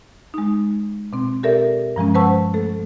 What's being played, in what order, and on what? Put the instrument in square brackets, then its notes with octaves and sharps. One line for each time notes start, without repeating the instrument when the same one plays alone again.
[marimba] G#3 D#4
B2 C4
G4 A4 A#4 D5 E5
G2 F3 G#3 C#4
B4 C5 F#5 A5 C#6 E6
A3 A4